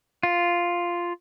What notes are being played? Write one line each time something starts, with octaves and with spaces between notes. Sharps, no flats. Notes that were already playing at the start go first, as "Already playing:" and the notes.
F4